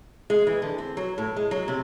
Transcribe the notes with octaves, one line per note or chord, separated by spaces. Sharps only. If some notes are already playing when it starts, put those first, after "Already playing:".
G#3
E3
D3
C4
F#3
A2
G#3
F#3
C3